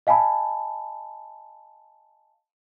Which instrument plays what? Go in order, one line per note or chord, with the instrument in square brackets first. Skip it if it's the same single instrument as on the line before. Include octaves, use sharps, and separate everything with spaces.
[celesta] D#5 F5 G#5 A5 B5